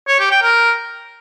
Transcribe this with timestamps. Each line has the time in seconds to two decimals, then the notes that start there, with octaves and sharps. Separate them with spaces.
0.08 C#5
0.19 G4
0.31 G5
0.42 A#4